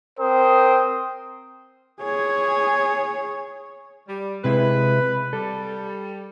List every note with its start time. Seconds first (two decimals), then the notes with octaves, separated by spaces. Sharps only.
0.20 C4 A#4 C5 G5 D#6
2.02 G#4 C#5
4.08 G3
4.44 C3 G#3 E4 B4
5.33 G3 A4